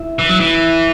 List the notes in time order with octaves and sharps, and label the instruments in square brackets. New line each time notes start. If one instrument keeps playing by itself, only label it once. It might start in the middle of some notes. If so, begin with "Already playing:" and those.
Already playing: [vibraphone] E4 E5
[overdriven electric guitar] E3
F#3
E3
[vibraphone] E4 E5